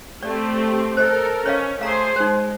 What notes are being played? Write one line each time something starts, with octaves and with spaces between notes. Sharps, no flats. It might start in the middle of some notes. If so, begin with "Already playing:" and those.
A3 C4 G4 D5
A4 A#4 C5 D#5
C#4 C#5 D#5 F5
A3 G#4 C5 F5 A#5
G#3 D#4 C5